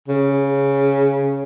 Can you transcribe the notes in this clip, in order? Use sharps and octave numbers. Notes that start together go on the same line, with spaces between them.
C#3